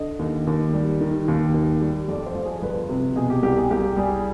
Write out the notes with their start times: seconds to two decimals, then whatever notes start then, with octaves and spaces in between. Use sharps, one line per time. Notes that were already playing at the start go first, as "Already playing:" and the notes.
Already playing: D3 D#5
0.19 D#2
0.47 D#2
0.73 G3
1.01 D#3
1.28 D#2
1.54 D#2
1.81 G3
2.08 F2 D5
2.26 C5
2.35 F3
2.45 G#4
2.62 G1 B4
2.89 C3
3.16 B2 G#4
3.30 G4
3.43 C2 G4
3.57 G#4
3.71 C2 G4
3.97 G3 G#4